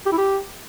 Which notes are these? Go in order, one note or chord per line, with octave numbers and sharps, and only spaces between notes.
G4
E4
G4